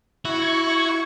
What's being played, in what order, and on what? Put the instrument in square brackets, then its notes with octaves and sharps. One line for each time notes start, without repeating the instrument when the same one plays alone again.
[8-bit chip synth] E4 [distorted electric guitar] F#4 [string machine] C#6 G#6